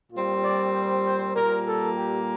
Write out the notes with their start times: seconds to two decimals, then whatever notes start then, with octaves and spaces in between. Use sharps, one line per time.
0.12 A#2 G3 C4 F4
0.43 D5
0.74 C5
1.05 C5
1.36 A#2 G3 A#3 A#4
1.67 A4
1.97 G4